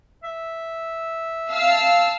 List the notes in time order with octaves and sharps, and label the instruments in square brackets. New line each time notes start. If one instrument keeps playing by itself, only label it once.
[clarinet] E5
[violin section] F5 A5 E6